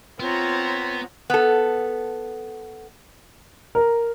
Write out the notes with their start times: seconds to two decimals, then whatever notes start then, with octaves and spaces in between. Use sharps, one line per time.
0.20 B3 C4 F4 C#5 A#5
1.30 B3 A4
3.75 A#4